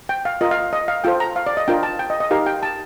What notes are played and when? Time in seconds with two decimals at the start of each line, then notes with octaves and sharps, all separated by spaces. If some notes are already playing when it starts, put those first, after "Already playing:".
0.09 G5
0.25 F5
0.41 F4 A#4 D#5
0.51 F5
0.73 D#5
0.88 F5
1.04 F4 A4 C5 G5
1.20 A#5
1.36 F5
1.47 D5
1.57 D#5
1.68 D4 F4 A#4 G5
1.83 A5
1.99 G5
2.10 D#5
2.20 D#5
2.31 D#4 G4 A#4 F5
2.46 G5
2.63 A5